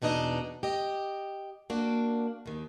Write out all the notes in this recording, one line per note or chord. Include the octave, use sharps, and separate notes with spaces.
E2 B2 D4 D#4 D#5
G4 D#5
A#3 D4 F#4
D#2 D#3